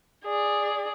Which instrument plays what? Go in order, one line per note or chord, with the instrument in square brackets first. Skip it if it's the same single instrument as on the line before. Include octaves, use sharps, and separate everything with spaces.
[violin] G#4 D5